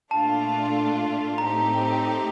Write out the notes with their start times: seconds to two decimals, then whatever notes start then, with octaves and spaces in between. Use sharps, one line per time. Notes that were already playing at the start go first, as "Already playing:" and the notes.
0.11 A#2 A3 D4 F4 A5
1.38 A2 A3 C4 D#4 G4 A#5